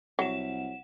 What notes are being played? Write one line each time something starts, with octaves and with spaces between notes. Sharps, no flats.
C2 F#3 F#5 E7